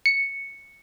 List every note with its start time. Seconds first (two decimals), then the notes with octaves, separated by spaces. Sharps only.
0.06 C#7